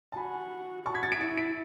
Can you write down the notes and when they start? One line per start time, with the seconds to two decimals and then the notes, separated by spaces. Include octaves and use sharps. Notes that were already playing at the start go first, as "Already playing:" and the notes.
0.12 A5
0.16 F#4 G#5 B5
0.86 F#4 A5 C#6
0.94 G#6 B6
1.02 A6 C#7
1.12 B6 D7
1.21 E4 A6 C#7
1.37 B6 D7